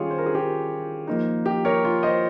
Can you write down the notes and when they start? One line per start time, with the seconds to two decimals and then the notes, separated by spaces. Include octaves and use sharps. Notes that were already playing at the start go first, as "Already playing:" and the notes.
Already playing: D#3 G3 C#4 F4 G4 G#4 C#5 F5
0.10 C5
0.18 A#4
0.26 G#4
0.35 G4 A#4
1.07 F3 A#3 D#4
1.46 G4
1.65 A#4 C#5
1.84 F4
2.03 C5 D#5